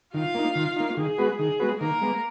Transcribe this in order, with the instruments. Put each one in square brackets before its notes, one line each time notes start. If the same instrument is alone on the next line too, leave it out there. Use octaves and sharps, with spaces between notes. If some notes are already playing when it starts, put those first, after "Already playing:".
[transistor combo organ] D#3 [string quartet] F4 F5
[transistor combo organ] A#3 D#4
D#3
A#3 D#4
[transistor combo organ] D#3 [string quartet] G#4
[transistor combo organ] G#3 B3 F#4 B4
[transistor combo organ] D#3 [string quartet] G#4
[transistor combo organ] G#3 B3 F#4 B4
[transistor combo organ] D#3 [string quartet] A#3 A#4
[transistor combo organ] G#3 B3